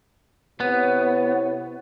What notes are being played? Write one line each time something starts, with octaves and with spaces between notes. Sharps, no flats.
C3 B3 E4 C#5